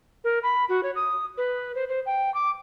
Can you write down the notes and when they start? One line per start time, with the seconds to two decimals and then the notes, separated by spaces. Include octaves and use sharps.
0.24 A#4
0.43 B5
0.69 F#4
0.83 C#5
0.96 D#6
1.38 B4
1.75 C5
1.89 C5
2.06 G5
2.34 D6